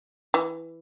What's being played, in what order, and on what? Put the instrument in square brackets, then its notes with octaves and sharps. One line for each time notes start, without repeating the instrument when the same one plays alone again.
[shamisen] E3